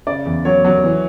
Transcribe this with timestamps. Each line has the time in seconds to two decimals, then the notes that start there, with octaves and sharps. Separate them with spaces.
0.07 C#3 D5
0.25 E2
0.45 F#3 C#5
0.65 F#3
0.84 E3